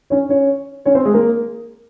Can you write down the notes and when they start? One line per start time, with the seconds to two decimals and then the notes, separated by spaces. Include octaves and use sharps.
0.10 C#4 C#5
0.29 C#4 C#5
0.85 C#4 C#5
0.95 C4 C5
1.05 G#3 G#4
1.14 A#3 A#4